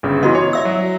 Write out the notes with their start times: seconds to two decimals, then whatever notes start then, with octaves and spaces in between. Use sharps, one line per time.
0.03 G1 C#3
0.23 E3 B3 E4 F#4 D#5
0.35 C#5
0.53 D5 E5 E6
0.65 F#3